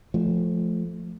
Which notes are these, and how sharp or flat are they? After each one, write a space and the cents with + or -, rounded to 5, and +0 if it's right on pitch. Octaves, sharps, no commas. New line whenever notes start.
F3 +0 A3 -10